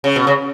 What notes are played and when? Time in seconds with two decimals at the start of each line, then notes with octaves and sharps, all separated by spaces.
0.04 C#3
0.16 B2
0.27 C#3